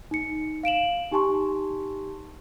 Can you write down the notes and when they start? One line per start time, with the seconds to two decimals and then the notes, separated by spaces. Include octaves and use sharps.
0.11 D#4 C#7
0.63 F5 D7 E7 F#7
1.11 D#4 G4 G#5 A5 C6 C#6